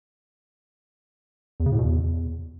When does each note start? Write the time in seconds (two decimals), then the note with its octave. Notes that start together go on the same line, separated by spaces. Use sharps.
1.60 E2
1.66 C#3
1.72 A2
1.78 B2
1.85 E2